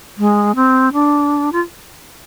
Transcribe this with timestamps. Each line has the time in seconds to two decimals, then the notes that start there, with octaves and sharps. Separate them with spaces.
0.18 G#3
0.55 C4
0.93 D4
1.52 F4